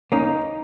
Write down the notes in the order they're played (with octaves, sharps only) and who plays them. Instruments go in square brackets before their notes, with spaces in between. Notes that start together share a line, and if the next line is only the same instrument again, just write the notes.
[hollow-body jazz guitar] A#3 C#4 [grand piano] D#4